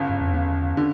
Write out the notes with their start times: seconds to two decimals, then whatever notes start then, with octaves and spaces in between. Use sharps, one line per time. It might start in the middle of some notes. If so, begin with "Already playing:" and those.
Already playing: G1 C#3
0.09 G2
0.21 F2
0.34 E2 C#3
0.77 D3